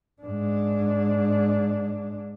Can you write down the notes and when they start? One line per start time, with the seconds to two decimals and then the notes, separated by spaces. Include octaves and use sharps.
0.22 G#2 D4